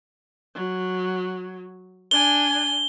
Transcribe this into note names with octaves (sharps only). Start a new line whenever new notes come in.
F#3
D4 G#5 G7